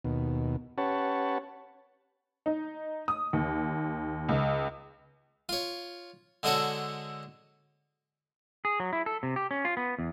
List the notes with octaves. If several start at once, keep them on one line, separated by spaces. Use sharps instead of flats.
D#2 B2
C#4 G4 B4 C#5 F#5 A5
D#4
D#6
D#2
C#2
F4 C#5
D3 G#3 D4 F#4 A4 C#5
G#4
F#3
E4
A4
C3
G4
C#4
F4
B3
E2